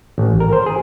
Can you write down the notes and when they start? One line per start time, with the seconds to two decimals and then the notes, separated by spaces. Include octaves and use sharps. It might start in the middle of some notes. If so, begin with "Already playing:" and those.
0.18 A1
0.40 A#4
0.53 C5
0.66 G#4